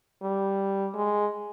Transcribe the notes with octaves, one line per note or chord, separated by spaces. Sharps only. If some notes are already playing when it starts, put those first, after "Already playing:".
G3
G#3